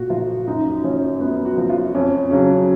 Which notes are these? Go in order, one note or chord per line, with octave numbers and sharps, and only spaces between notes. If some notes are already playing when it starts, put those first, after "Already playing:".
Already playing: A#2 F#4
F3 F4
F#2 D#4
F3 C#4
F#2 B3
F#4
F3
F4
F2 C#4
C#3 F#3 C#4